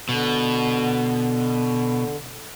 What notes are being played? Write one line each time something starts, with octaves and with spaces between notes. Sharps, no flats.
B2 D3